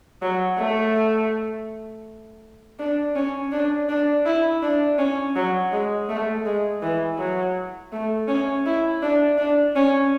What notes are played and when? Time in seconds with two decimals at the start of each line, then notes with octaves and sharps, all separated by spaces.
0.22 F#3
0.58 A3
2.79 D4
3.15 C#4
3.52 D4
3.89 D4
4.26 E4
4.62 D4
4.98 C#4
5.36 F#3
5.72 G#3
6.09 A3
6.46 G#3
6.82 E3
7.18 F#3
7.92 A3
8.28 C#4
8.66 E4
9.03 D4
9.38 D4
9.76 C#4